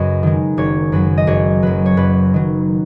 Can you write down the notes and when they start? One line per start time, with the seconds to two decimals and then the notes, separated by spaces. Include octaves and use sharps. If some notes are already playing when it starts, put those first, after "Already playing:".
Already playing: F#2 C#3 F#3 B4 C#5 D#5
0.23 D#3 G#3
0.57 F#1 C#5
0.92 F#2 C#3 F#3 B4
1.17 D#5
1.27 F#1 C#5
1.62 F#2 F#3 B4
1.86 C#5
1.97 F#1 B4
2.34 D#3 F#3